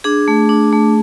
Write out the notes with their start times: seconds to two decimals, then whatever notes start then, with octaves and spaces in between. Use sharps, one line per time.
0.04 D4 G#4
0.28 A3
0.49 D4
0.73 A3